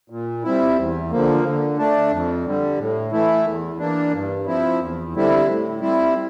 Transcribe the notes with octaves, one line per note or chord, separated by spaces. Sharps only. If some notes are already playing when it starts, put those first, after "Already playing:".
A#2
G3 C4 E4
E2
D3 F3 A#3
D3
A3 D4
F2
D3 G3
A2
E3 A3 E4
E2
E3 A#3 D4
G2
F3 C4 E4
E2
D3 G3 C4 E4
A2
G3 C4 E4